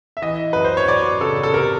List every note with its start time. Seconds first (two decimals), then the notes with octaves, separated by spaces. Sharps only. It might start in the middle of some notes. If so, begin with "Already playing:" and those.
0.17 E5
0.22 E3 D#5
0.53 F#2 B4
0.64 C5
0.77 C#5
0.88 F#2 D5
1.21 C#3 A4
1.43 A4
1.54 C3 A#4